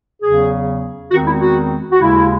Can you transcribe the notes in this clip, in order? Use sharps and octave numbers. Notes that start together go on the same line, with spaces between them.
E2 C#3 F#3 C#4 G#4
E2 D#3 G#3 C4 F#4
E4
F#4
F#4
D#2 C#3 G#3 E4